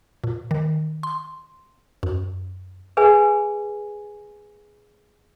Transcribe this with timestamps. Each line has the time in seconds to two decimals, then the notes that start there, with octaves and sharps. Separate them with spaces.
0.24 A#2
0.51 D#3
1.03 C6
2.03 F#2
2.97 G#4 B4 E5 G#5